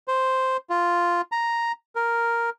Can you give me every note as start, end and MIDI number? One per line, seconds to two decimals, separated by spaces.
0.08 0.57 72
0.70 1.21 65
1.32 1.72 82
1.95 2.50 70